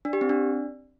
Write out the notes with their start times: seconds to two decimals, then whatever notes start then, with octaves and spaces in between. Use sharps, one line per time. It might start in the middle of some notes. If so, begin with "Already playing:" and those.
0.05 D4
0.13 G4
0.21 C4
0.29 D4